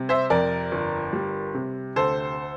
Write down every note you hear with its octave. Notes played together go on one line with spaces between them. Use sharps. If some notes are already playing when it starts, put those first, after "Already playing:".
Already playing: C3 G3
C5 E5
F2 A#4 D5
G1
G3
C3
D2 A4 C5